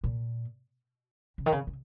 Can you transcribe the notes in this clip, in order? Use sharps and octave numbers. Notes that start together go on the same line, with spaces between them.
A#2
C#3
D#3
C#3
C#3